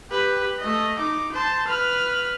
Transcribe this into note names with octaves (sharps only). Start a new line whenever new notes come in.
G4 B4
A3 D#5
D#4 D6
C5 A5
B4 F6